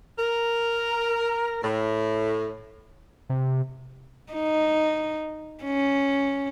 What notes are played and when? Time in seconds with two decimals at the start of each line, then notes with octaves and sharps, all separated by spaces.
0.19 A#4
1.63 A2
3.29 C3
4.33 D#4
5.64 C#4